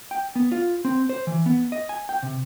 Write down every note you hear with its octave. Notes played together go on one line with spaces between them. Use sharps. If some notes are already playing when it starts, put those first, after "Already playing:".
G5
B3
F4
C4
C5
E3
B3
D#5
G#5
G5
C3